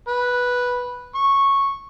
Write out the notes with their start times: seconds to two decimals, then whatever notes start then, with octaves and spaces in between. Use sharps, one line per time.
0.08 B4
1.15 C#6